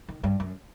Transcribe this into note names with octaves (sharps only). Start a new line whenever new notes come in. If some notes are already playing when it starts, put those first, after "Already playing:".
D#3
G2
F#2